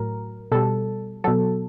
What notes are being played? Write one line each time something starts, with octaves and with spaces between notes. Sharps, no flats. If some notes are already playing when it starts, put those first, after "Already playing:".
Already playing: A2 F#3 A#4
B2 G3 A4
B2 F#3 A4